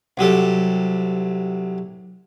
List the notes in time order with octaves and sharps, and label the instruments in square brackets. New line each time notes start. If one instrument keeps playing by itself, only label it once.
[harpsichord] C2 F#3 G4 A4